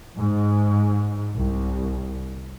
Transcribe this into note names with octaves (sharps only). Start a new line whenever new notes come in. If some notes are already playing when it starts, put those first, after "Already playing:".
G#2
C2